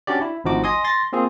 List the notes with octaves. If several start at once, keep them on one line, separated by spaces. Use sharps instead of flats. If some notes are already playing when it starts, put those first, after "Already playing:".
C#4 D4 F#4 G4 D5
E4
G#1 D2 F3 D#4 F#4 D6
D#5 G#5 C6 D#6
C6 A6 A#6
A#3 C4 F4 G#4